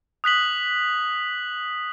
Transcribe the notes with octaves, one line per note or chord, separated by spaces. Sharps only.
D#6 F#6 B6 F#7